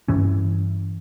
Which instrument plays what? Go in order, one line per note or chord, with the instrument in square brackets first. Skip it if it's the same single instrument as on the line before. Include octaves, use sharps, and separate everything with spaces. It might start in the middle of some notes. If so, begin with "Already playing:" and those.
[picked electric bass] G2 E3 C#4